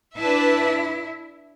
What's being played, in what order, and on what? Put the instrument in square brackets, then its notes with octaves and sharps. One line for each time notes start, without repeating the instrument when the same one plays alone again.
[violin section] D4 B4 E5 A5 [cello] E4